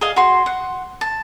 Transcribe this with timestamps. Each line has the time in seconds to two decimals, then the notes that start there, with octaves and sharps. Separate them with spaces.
0.01 G#4 D#5 F5
0.16 F#4 G#4 C6
0.46 F#5
1.01 A5